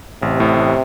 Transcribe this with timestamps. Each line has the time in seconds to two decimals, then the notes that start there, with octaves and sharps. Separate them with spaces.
0.22 A1 C3
0.40 A2
0.57 A1